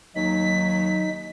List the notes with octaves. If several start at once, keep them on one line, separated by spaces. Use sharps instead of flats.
D#2 F#3 D#4 B6